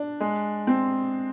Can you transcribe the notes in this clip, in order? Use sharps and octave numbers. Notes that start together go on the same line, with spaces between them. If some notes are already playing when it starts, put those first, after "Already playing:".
Already playing: D4
G#3
C4